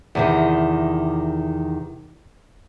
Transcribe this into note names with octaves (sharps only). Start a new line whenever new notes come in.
E2 C3 D#3